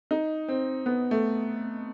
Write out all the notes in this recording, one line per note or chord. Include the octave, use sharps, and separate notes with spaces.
D#4
C4
B3
A3